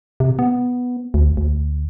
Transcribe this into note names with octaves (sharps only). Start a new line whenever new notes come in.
C3
B3
D2
D2